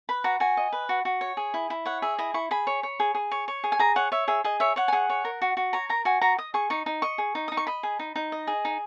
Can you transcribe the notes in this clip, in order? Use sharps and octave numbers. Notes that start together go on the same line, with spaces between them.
B4 B5
F#4 A#5
F#4 G#5
D#5
B4
F#4
F#4
C#5
G#4
E4
E4
C#5 F#5
G#4 E5
E4 D#5
E4 C#6
G#4 B5
C#5
C#5
G#4
G#4
C#5
C#5
G#4
G#5
G#4 A#5
C#5 F#5
C#5 E5
G#4 E5
G#4 D#5
C#5 E5
C#5 F#5
G#5
G#4 F#5
C#5
A#4
F#4
F#4
C#5 A#5
A#4 A#5
F#4 G#5
F#4 A#5
D#5 D#6
G#4 C#6
D#4 C#6
D#4
D#5 C#6
G#4
D#4
D#4 D#6
C#6
D#5 B5
G#4
D#4
D#4
D#5
G#4
D#4